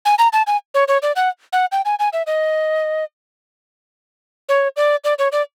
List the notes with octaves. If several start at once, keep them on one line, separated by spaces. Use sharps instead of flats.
G#5
A#5
A5
G#5
C#5
C#5
D5
F#5
F#5
G5
G#5
G#5
E5
D#5
C#5
D5
D5
C#5
D5